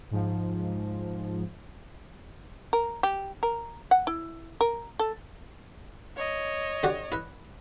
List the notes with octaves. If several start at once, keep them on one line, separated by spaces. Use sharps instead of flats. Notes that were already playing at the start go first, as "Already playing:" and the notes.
G#2 F3
A#4
G4
A#4
F#5
E4
A#4
A4
C#5 D#5
D3 F#4 G4
E4 B4